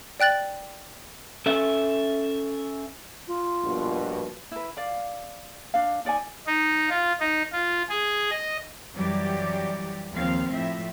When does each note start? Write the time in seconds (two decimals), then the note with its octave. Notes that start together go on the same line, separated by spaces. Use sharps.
0.20 D5 G5 F#6 A6 F#7
1.46 C#4 A4 E5
3.28 F4
3.64 A#1 G2 B2
4.51 E4 B4
4.77 D5 F5
5.74 D4 F5
6.05 D#4 D5 F5 G#5
6.47 D#4
6.90 F4
7.20 D#4
7.52 F4
7.89 G#4
8.30 D#5
8.94 F#2 E3 F#3 G3 G4 D5
10.12 D#2 F3 C4 F5
10.52 A2 F3 E5